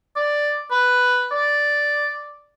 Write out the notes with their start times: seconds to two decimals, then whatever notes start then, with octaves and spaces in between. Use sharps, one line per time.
0.16 D5
0.71 B4
1.31 D5